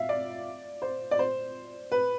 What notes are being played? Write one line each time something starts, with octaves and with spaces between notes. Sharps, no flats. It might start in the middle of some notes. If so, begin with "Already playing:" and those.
Already playing: E5 F5
D5
C5
D5
C5
B4